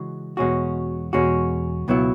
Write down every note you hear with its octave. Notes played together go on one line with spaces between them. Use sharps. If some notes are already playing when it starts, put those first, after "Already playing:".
Already playing: C#3 E3 G#3 F#4
E2 B2 G#3 C#4 F#4
E2 B2 G#3 C#4 F#4
C#2 B2 F#3 B3 E4